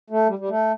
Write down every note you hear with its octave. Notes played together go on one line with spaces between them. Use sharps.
A3
G3
G3
A3